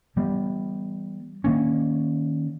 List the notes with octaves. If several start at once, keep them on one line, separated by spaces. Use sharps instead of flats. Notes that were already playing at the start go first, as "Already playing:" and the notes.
E3 G3 B3
D#3 A#3 C#4